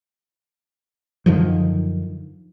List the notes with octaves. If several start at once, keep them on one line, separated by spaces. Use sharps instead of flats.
F#2 D3 D#3 F3